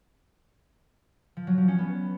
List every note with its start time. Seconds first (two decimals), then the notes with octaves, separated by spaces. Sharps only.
1.37 F3
1.47 F#3
1.58 F3
1.68 C#4
1.79 B3